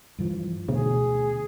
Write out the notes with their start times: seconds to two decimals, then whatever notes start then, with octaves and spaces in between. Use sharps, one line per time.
0.19 G2 E3 F3
0.68 D2 B2 G#4